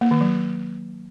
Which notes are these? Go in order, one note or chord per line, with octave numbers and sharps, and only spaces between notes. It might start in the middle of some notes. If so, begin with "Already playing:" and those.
A#3
D#3
F#3